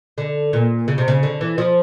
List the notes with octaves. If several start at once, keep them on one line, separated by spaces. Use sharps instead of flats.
D3
A#2
C#3
C3
C#3
D3
E3
F3